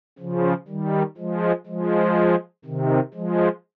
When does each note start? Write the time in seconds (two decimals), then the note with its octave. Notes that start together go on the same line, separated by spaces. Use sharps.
0.19 C#3 F3
0.68 D#3 G3
1.18 F3 G#3
1.66 F3 G#3
2.65 C3 D#3
3.14 F3 G#3